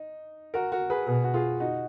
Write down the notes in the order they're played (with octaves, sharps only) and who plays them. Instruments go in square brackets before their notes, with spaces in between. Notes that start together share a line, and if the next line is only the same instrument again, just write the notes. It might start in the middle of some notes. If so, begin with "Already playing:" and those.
Already playing: [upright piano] D#4
F#4 A#4
F#4 A#4
G#4 B4
[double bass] B2 [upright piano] G#4 B4
[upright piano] F#4
F4 G#4
D#4 F#4